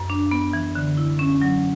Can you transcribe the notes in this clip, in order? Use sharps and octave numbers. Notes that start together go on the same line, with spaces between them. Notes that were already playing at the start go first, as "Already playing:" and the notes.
Already playing: F#2
D4
B3
E3
D3
E4
C#4
F#3